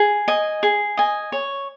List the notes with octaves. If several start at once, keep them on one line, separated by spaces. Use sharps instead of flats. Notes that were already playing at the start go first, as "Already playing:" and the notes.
Already playing: G#4
D#5 G#5
G#4
D#5 G#5
C#5